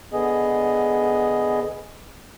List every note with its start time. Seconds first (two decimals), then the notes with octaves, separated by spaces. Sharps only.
0.13 D3 B3 G#4 D#5